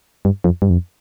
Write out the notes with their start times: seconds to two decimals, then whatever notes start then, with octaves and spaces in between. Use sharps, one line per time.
0.25 G2
0.44 F2
0.62 G2
0.70 F2